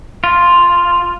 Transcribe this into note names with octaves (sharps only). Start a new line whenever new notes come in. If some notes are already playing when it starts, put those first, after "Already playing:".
F4